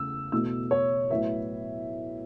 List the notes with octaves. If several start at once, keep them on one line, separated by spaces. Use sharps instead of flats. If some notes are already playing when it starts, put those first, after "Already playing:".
Already playing: E2 C#3 A3 E6
E2 B2 A3 E6
C#5
A2 F#3 B3 E5